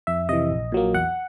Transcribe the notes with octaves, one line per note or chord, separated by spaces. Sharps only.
F2 E5
C3 E3 D#5
A#1
A#2 F#3 A#3
E2 F#5